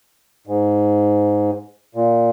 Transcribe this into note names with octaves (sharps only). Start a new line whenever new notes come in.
G#2
A#2